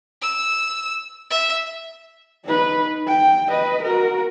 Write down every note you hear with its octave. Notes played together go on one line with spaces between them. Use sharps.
E6
E5
D#4 B4
G5
B4 D#5
F#4 A#4